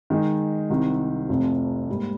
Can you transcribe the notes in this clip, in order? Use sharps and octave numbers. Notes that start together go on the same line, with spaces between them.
D#3 G#3 D#4
C2 C3 D#3
F1 F2 C3 F3
G#2 G3 A#3